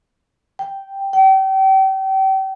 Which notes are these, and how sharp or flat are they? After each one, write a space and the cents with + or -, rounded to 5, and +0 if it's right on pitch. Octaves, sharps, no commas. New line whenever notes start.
G5 -5
G5 -35